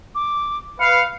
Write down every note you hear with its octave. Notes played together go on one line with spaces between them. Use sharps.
D6
B4 F5 C#7